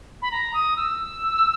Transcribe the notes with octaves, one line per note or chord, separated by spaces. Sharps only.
B5
A#5
D#6
E6